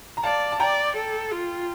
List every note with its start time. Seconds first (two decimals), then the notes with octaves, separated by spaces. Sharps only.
0.17 A#5
0.23 D5 F5 A5
0.52 A5
0.60 D5 G5 A#5
0.97 A4
1.32 F4